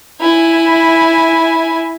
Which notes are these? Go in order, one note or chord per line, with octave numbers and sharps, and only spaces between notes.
E4 G#5